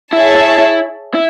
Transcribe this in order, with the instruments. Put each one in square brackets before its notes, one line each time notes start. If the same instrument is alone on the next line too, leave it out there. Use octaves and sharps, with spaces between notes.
[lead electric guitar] E4 [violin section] G#4 C#5 E5 A5
[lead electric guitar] E4
E4
E4